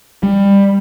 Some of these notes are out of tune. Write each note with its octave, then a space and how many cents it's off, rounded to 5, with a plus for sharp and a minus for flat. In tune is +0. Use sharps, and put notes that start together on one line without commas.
G3 +20